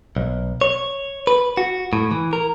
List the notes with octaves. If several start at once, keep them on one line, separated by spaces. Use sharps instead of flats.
B1
C#5
B4
F#4
A2
E3
A#4